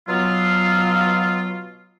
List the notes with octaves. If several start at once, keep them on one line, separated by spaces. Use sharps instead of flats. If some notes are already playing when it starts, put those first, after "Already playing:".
B2 F#3 B3 F4